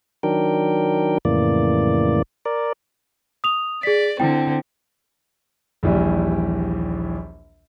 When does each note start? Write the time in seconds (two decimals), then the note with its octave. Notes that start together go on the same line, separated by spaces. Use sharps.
0.23 D#3 F#3 D4 A#4 G5
1.25 F2 A2 C#3 E3 A#3 D5
2.45 A#4 D5
3.44 D#6 F7
3.83 G#4 D5 B6
4.20 D3 C4 E4 G5
5.83 A#1 D#2 E3 G3